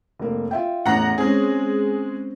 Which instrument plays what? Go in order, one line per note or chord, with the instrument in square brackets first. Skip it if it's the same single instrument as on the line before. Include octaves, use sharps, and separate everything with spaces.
[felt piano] F1 A#3
F4 E5 G5
[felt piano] A1 E2 [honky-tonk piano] F#5 A#5 A#6
[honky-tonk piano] G#3 G#4 [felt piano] C4 C#4